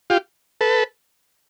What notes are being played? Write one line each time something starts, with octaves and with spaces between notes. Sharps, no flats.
F4 G4
A4 B4